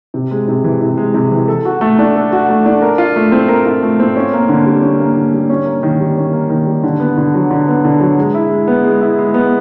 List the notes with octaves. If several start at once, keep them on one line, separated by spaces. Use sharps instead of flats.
C3
G#3
C3
E3
C3
G#3
C3
E3
A4
F#4
A3
D4
A4
F#4
A3
D4
A#4
F4
A3
C4
A#4
F4
A3
C4
C#4
A#3
D3
G3
C#4
A#3
D3
G3
C#4
A#3
D#3
G3
C#4
A#3
D#3
G3
D3
B3
D3
F#3
D3
B3
D3
F#3
G#3
E4
G#3
B3
G#3
E4
G#3
B3